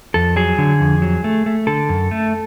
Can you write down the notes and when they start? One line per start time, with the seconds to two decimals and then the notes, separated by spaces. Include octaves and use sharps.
0.14 F2 A4
0.36 F#3 G#4
0.58 D3
0.80 F2
1.02 F#3
1.24 A3
1.46 A3
1.67 D3 A4
1.89 F#2
2.11 A3